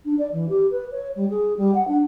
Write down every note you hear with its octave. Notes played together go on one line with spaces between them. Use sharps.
D4
D5
E3
G4
B4
C#5
G3
G#4
G3
F#5
D4